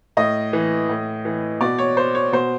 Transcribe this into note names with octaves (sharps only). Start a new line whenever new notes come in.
A2 D#5
E3
A2
E3
B2 D5
C#5
C5
C#5
B2 C5